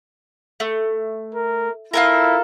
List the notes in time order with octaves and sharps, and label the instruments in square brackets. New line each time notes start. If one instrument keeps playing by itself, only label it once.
[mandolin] A3
[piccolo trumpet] A#4
[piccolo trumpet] E4 [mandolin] F4 A4 A#4